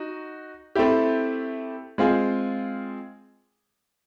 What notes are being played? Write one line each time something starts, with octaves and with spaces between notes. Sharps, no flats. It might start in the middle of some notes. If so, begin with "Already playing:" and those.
Already playing: D#4 F#4
A3 C4 E4 G4
G#3 C4 F4 G#4